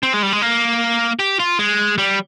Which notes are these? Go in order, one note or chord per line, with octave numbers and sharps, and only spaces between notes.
C4
G#3
G3
G#3
A#3
G4
F4
G#3
G3